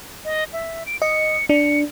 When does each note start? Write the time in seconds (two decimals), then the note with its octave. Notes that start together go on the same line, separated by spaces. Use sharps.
0.25 D#5
0.53 E5
0.86 D7
1.02 D#5 C#7
1.49 D4 C#7